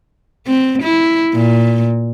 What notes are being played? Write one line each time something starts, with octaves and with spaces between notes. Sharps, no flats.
C4
E4
A#2